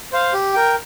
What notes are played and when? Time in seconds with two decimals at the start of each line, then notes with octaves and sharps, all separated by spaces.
0.12 C5 F5
0.34 G4
0.54 A#4 G5